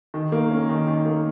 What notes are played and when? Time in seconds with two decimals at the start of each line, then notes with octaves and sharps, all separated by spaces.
0.14 D#3
0.32 A#3
0.51 C#4
0.69 D#3
0.87 D#3
1.05 A#3